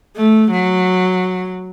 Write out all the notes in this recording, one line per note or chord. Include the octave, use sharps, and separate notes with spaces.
A3
F#3